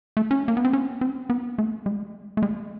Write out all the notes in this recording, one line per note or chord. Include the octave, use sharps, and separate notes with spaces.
A3
C#4
A#3
B3
C4
C#4
C4
B3
A3
G#3
A3
G#3